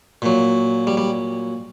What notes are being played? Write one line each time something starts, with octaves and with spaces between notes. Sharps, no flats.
A#2 F#3
G3
G3